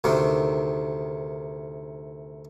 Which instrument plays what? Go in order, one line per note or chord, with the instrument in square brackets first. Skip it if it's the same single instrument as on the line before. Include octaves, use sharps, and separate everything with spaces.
[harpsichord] D2 C3 D#3